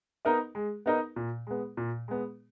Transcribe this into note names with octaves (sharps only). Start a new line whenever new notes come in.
B3 D#4 A#4 D#5
G#3
B3 D#4 A#4 D#5
A#2
G#3 B3
A#2
G#3 B3